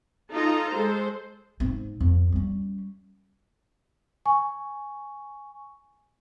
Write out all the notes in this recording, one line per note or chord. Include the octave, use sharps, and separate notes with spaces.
D#4 F4 A4 A5 A#5
G#3 A4 C5
G#2 C4
F2
G3 C#4
G#5 C#6